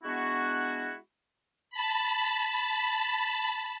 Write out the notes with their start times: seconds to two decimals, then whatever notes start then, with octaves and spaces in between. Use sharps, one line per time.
0.04 G#3 B3 D4 E4 F#4
1.70 A5 B5